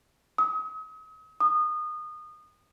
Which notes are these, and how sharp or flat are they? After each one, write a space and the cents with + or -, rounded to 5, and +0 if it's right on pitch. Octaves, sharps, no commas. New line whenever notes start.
D#6 +40
D#6 -25